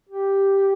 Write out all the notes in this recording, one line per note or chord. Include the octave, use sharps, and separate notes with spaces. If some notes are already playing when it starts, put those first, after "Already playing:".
G4